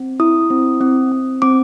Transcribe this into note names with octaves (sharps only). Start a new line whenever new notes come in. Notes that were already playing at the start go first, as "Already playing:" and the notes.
Already playing: C4
E4 D#6
C4
C4
C4
C4 D6